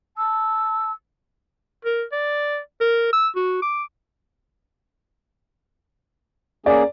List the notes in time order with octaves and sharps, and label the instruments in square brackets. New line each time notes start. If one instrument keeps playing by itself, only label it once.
[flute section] A5 E6
[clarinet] A#4
D5
A#4
E6
F#4
D6
[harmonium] A#3 C#4 G#4 [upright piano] D5